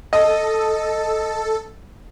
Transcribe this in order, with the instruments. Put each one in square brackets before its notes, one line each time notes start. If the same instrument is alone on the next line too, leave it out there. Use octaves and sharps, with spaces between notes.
[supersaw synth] A4 [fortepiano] D#5